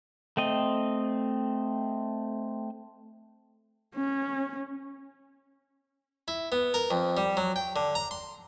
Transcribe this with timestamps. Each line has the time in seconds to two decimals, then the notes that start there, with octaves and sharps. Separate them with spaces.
0.37 A3 C4 D#5
3.95 C#4
6.28 E4
6.52 B3
6.74 A#4
6.91 F2
7.17 G3
7.37 F#3
7.56 G5
7.76 D3
7.95 A#5
8.11 C6